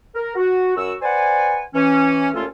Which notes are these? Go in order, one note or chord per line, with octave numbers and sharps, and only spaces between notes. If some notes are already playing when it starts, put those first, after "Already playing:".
A#4
F#4
F#2 F#4 E6
B4 C5 D5 F#5 G#5
E3 C#4
D#2 A#2 A3 C#4 F4 A4